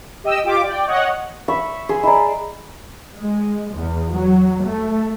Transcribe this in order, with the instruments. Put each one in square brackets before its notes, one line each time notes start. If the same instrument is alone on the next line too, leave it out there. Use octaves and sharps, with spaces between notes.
[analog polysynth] G4 D#5 G5 E6
F4 G4 D6
D5 G5
C#5 D#5 F#5
[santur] E5 B5 C#6
G#4 C6
[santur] E4 D5 [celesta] D#5 G#5 A#5
[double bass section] G#3
E2
F#3
A3